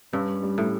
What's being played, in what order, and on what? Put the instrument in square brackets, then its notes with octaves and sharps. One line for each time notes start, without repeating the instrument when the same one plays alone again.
[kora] G2 [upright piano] C#4
[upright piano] G3
[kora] A2